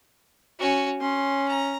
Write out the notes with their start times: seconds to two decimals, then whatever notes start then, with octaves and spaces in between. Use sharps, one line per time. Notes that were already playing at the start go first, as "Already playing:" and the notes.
0.60 C#4 F#4
1.01 C#4 C6
1.48 A#5